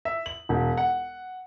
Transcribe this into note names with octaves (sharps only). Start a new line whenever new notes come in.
E5
F#7
E1
F#5